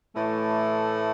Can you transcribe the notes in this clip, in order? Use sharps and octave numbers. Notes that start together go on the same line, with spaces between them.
A2 E3 A3